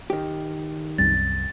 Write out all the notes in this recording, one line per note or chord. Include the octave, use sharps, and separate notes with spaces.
D#3 G4
C2 F#2 G3 A6